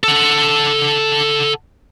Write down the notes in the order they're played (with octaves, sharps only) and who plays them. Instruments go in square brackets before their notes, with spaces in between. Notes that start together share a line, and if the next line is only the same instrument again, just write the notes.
[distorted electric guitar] A4 F#5